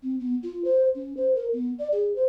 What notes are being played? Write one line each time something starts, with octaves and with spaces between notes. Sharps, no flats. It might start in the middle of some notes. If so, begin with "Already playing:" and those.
C4
B3
F4
C5
C#4
C5
A#4
B3
D5
G#4
C5